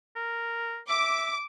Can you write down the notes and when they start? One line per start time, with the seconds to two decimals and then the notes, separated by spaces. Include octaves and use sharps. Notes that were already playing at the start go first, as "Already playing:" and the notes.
0.16 A#4
0.89 E5 D6